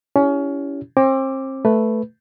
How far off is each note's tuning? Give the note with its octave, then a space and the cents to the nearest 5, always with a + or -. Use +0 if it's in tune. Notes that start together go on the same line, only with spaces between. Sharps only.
C#4 +25 E4 +0 G4 +0
C4 +35 D6 +0
A3 +0 B4 +0